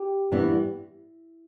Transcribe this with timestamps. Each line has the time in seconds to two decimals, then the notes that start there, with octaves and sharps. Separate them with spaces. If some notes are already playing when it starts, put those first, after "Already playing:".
Already playing: G4
0.32 G2 E3 B3 E4